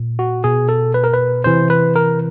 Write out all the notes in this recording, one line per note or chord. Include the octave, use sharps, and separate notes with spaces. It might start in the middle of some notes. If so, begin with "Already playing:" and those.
Already playing: A#2
F#4
B2 G#4
A4
B4
A#4
B4
C3 E3 C5
B4
A#4